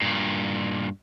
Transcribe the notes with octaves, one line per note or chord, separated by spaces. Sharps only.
G2 A#2